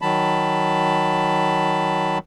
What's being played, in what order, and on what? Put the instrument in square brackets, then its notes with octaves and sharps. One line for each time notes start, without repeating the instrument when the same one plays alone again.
[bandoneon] D#3 F#3 A5 B5